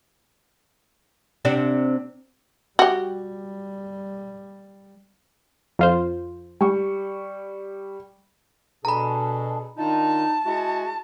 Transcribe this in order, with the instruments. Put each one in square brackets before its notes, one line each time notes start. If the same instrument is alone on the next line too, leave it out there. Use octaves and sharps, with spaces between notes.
[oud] C3 C4 D4
[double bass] G3 [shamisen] F#4 G4
[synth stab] F2 F4 C5
[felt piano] G3 C#6
[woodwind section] B2 [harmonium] D4 G#4 A4 [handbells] A#5 B5
[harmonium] D#3 D4 F4 [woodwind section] D#4 [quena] A5
[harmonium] G#3 [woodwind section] E4 F#4